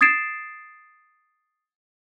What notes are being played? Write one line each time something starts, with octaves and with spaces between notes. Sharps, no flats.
D#6 G#6 A6 C7 D7 E7